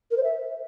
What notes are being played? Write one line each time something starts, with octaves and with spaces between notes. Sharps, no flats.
A#4
C5
E5